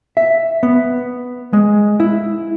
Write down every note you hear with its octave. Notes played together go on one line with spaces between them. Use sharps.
E5
B3
G#3
E4